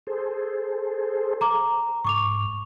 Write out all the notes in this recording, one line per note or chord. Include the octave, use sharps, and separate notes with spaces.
G#4 A4 C5
A#5 D6
G#2 C#6 D6 F7